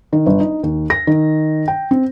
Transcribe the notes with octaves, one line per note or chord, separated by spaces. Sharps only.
D#3
G1
D#4
D#2
A#6
D#3
G5
C4